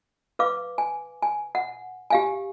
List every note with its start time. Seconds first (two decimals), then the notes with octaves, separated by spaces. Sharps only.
0.39 B4 F5 D6
0.78 G#5
1.22 G#5
1.55 F#5
2.10 G4 F5 G#5